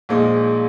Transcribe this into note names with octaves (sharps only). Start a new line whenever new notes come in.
A#1 A#2 G#3 D#4